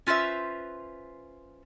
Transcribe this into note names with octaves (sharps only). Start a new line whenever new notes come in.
C#4 F4 B4 C5 E5